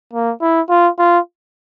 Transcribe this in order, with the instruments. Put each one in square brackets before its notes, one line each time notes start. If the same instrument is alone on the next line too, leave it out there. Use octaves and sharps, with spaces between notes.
[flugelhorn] A#3
E4
F4
F4